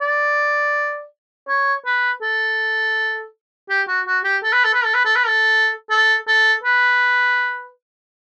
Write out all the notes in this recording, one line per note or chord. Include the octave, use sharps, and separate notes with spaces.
D5
C#5
B4
A4
G4
F#4
F#4
G4
A4
B4
A4
B4
A4
B4
A4
B4
A4
A4
A4
B4